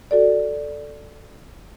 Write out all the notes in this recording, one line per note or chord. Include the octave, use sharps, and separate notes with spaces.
F#4 A4 D5